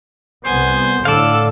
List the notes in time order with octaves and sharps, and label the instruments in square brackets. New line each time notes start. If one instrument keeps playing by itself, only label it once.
[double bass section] C2 B3 [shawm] C5 [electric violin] G#5
[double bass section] A2 D3 [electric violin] A4 E6 [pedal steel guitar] D5 F5